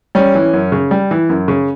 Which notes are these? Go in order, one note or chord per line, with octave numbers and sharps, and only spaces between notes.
G3 C#4
E3
F#2
C#3
G3
E3
F#2
C#3